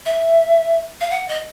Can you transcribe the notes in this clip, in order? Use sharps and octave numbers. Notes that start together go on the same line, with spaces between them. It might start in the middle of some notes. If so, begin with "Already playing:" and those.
E5
F5
F#5
D#5